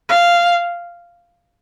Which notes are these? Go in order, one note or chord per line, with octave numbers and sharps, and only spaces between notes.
F5